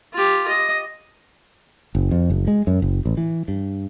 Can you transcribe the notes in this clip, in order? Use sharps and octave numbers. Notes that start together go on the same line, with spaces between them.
F4 G4
D#5
F#1
F2
F#1
G#3
F#2
F#1
A1
E3
G2